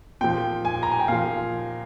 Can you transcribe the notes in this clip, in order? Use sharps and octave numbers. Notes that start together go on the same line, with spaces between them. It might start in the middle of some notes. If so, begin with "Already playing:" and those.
A#2 F3 G5
G#5
A#5
G#5
G5
A#2 F3 F5